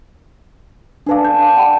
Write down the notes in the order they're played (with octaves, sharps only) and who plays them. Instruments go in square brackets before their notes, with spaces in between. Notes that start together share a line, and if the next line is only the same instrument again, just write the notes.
[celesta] D4 B4 F5 [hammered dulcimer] G#4 A4 D5
[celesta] G6
[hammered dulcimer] G4 D5 [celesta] F#5 G5 B5